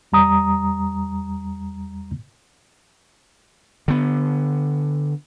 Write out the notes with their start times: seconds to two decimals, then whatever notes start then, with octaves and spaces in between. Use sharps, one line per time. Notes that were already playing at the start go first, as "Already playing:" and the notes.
0.12 E2 G3 A#5 D#6
3.88 D3 B3